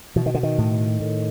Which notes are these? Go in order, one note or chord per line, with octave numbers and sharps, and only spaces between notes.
B2 E3
D#3
D3
D#3
A2
A2